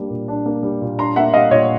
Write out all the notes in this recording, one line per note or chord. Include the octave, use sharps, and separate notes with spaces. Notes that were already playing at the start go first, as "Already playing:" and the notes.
Already playing: G3 A#3 D4
A#2
D4
A#3
G3
A#2
D4 A#5 C6
A#3 E5 F#5
G3 D#5 F5
A#2 C#5 D#5